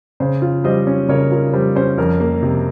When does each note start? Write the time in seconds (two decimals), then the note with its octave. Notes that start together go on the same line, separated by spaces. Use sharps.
0.20 C#3 C5
0.42 F4
0.64 G3 C5 D#5
0.87 C#4
1.08 C#3 A#4 C#5
1.31 F4 A#4
1.53 G3 C5
1.76 C#4 C5
1.98 F2 A#4
2.20 A#3
2.43 C3